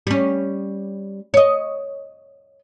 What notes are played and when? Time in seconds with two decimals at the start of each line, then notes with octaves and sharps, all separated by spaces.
0.07 G3 C#4
1.34 C#5 D#5